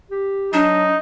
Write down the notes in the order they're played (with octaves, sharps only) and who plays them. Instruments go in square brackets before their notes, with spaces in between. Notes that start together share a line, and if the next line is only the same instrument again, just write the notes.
[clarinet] G4
[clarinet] F#3 [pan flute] D4 [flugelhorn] D#4